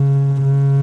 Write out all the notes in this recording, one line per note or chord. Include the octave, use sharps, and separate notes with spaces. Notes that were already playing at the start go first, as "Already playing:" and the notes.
Already playing: C#3
C#3